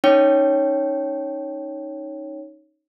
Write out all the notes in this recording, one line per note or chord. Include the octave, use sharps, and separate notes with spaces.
C#4 D#4 C#5 G5